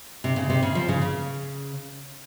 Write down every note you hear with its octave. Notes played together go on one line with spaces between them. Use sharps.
C3
C#3
C3
C#3
F3
C#3
C#3